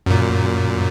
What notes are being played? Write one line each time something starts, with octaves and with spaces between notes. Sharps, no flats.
F#2 A#2